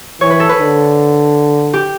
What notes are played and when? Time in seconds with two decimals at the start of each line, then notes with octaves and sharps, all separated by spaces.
0.21 E3 C#5
0.30 B4
0.40 A4
0.49 B4
0.60 D3
1.73 G4